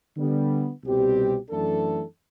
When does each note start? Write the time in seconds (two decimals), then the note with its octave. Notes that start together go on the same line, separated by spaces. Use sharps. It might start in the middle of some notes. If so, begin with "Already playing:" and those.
0.17 D3 G3 B3
0.83 C2 B2 G3 C4 G4
1.50 F#2 E3 A3 D4 A4